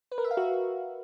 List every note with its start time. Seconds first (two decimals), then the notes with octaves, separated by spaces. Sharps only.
0.12 B4
0.18 A#4
0.24 E5
0.31 F5
0.37 F#4